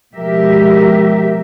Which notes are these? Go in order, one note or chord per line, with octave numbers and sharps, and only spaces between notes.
B2 F3 G#3 G4 A#4 E5